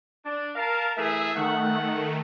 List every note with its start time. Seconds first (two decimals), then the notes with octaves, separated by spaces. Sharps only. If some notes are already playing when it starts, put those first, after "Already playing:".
0.24 D4
0.55 A#4 F5 A5
0.96 E3 A3 G#4 E5
1.36 D#3 A3 F#5